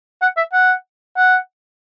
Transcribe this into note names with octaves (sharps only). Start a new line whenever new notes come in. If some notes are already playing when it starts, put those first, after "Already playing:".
F#5
E5
F#5
F#5